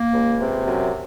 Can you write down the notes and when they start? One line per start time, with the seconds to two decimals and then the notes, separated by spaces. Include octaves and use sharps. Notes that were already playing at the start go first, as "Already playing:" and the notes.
Already playing: A#3
0.12 C#2
0.41 C3
0.67 F#2